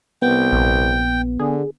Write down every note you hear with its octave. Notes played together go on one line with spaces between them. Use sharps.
C2 B3 G5
A#1
D3 G#4